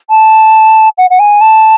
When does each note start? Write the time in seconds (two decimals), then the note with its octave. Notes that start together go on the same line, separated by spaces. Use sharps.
0.10 A5
0.98 F#5
1.10 F#5
1.19 G#5
1.41 A5